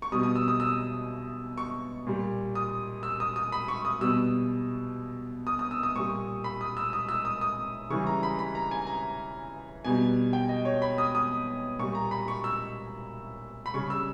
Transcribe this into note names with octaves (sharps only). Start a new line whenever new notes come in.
C#6
B2 G3 D#6
D#6
E6
D#6
E6
C#6
A#2 G3
D#6
E6
D#6
D#6
B5
C#6
D#6
B2 G3 E6
D#6
D#6
E6
D#6
A#2 G3 C#6
B5
D#6
E6
D#6
E6
D#6
D#6
C#3 E3 G3 C#6
A#5
B5
B5
A#5
G#5
A#5
B2 G3 G#5
G5
D#5
C#5
B5
D#6
D#6
A#2 G3 C#6
A#5
B5
C#6
E6
B5
C#3 G3 C#6
E6